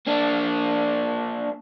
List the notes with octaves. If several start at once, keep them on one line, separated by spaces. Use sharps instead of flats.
A#3 D4